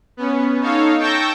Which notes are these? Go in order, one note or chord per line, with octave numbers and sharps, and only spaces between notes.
B3 C#4
D#4 A4 C#5 F5
G5 A5 C#6 E6 G6 A#6